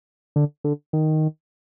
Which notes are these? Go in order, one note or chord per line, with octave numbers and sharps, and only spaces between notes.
D3
D3
D#3